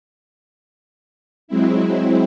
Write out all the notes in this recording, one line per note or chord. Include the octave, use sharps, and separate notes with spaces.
F#3 G#3 C4 E4